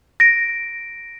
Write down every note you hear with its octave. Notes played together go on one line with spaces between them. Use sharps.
A#6 D7